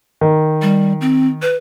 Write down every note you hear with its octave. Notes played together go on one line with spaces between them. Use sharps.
D#3
G3
C4
B4